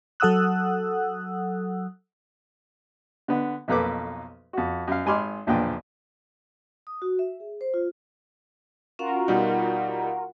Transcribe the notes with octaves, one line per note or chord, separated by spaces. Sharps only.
F#3 A4 F#5 D#6 E6 F#6
D3 B3
B1 F2 A#3 A4 B4 D6
F2 F#4
F#2 F5
G#1 G#5 B5 C6 D6 F6
B1 E2 A#2 D3 F3 G5
D#6
F#4
E5
G#4
C5
F4
C#4 F4 F#4 A#4 F5 F#5
B2 G3 D#4 F#5